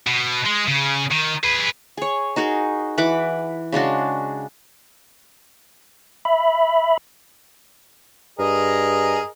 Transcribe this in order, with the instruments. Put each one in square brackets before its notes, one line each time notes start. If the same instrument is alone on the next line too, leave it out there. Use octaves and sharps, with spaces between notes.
[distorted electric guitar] B2
G#3
C#3
D#3
G#4 B4
[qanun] G#4 C#5
D#4 F#4 G#4 A#4
E3 F#5 B5 D6
C#3 G#3 D4 F#4
[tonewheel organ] E5 B5
[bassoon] G2 [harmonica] G#4 A#4 D#5